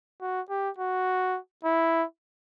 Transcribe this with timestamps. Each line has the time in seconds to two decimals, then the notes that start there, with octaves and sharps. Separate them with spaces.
0.21 F#4
0.50 G4
0.79 F#4
1.64 E4